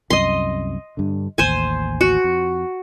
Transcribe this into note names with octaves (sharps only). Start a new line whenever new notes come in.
C2 F#2 D#5 C6
G2 D3
A1 D#2 C5 G#5
F#4
F2